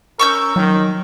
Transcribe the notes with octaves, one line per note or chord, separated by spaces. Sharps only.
C#4 A#4 C#6 E6 G6
D#3 F#3